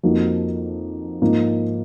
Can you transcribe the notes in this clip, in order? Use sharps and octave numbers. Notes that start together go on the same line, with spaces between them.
F2 F3 A#3 D#4 F#4
G#2 F3 A#3 D#4